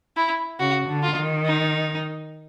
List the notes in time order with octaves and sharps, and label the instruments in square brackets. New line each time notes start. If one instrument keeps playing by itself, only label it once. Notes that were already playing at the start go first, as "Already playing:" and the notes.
[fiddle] E4
[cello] C#3 [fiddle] F#4
[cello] D3
[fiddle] F4
[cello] D#3
[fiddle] D#4